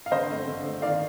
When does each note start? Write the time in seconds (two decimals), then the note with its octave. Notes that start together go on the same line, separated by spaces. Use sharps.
0.06 F5
0.11 D3 C5 D#5
0.30 A3 C4
0.48 D3
0.64 A3 C4
0.82 D#3 D5 F5